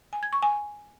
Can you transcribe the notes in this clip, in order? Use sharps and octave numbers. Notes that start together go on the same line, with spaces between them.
G#5
G#6
C#6
G#5